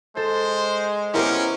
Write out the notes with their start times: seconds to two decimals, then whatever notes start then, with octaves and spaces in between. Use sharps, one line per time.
0.17 G#3 A4 C5
1.14 B3 C#4 E4 G4 A#4 C5